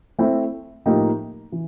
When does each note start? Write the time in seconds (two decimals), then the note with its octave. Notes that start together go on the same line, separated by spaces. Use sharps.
0.19 A3 C4 E4
0.86 A2 F3 A#3 D#4 G4
1.52 E3